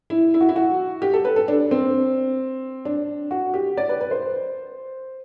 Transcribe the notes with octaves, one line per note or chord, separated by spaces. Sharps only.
E4
E4
F#4
E4
F#4
G4
A4
B4
A4
D4
C4
D4
F#4
G4
D5
B4
B4
C5